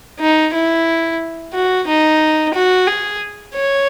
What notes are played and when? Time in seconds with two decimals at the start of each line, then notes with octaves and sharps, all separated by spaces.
0.20 D#4
0.54 E4
1.53 F#4
1.87 D#4
2.54 F#4
2.87 G#4
3.55 C#5